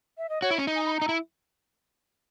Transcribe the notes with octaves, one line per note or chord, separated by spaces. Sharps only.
E5
D#5
F#4 C#5
E4
C#4
D#4
G#5
B5
D#4 A#5
E4